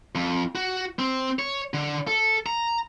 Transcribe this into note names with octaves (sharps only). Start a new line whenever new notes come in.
F2
F#4
C4
C#5
D3
A4
A#5